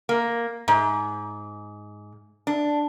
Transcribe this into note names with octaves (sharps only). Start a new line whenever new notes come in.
A#3
G#2
D4